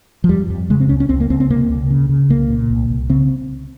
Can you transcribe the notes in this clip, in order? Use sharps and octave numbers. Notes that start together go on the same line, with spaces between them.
F3
F2 G3
F2
C#3 G#3
C4
C#2 C#4
C#4
C#2 C4
A#3
C#2 C4
C4
C3 A#3
C#2
C#3
C#3
C2 A#3
A#2
C2
C2
C#3 C4